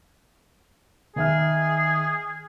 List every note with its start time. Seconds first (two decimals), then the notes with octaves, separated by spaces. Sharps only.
1.16 D#3 G#4 E5 F6